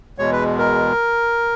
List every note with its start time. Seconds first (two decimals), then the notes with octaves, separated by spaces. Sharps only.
0.18 E2 B2 G#3 C#5
0.32 B4
0.58 A#4